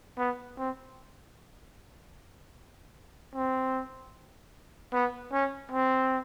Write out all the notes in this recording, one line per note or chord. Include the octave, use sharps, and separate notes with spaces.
B3
C4
C4
B3
C#4
C4